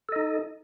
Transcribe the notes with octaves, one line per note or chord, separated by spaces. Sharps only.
D#4 A4 D#5